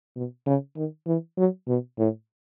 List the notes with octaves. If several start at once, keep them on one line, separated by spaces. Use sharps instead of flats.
B2
C#3
D#3
E3
F#3
B2
A2